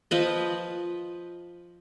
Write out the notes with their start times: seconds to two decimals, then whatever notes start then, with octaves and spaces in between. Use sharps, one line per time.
0.11 F3 B4 D#5